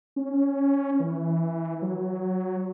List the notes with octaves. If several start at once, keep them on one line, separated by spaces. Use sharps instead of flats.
C#4
E3
F#3